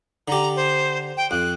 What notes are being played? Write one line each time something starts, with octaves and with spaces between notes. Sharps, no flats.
D3 G4 A#5
C5
G5
F2 F#6